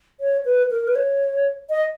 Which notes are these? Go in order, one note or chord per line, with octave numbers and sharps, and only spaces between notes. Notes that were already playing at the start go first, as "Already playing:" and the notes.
C#5
B4
A#4
B4
C#5
D#5